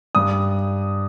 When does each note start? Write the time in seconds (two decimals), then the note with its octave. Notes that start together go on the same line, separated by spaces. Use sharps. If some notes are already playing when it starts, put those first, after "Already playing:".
0.15 G2 D#6